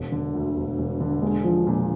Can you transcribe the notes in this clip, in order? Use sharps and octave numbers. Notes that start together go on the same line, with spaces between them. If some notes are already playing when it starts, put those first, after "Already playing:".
Already playing: E1
D3
D2
E1
E1
D3
G#3
F3
A#2